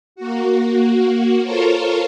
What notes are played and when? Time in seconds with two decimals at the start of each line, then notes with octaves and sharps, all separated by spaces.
0.16 A#3 F#4
1.42 F4 A4 A#4 C5 C#5